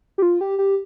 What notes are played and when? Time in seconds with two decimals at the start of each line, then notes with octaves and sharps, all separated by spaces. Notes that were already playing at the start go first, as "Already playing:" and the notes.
0.18 G4
0.22 F4
0.41 G4
0.59 G4